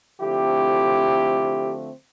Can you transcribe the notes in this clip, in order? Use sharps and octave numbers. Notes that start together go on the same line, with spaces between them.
D3 F3 A3 C4 E4 G4